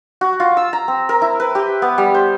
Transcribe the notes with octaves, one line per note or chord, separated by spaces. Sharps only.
F#4
F4
E6
A#5
C4
A#4
E4
B4
G4
B3
G3
C5